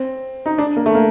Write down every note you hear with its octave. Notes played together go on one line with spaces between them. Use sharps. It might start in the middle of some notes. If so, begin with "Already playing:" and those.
Already playing: C4
D#4
D4
A#3
A3
A#3